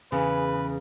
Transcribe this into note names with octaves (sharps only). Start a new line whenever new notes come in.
E2 C#3 B4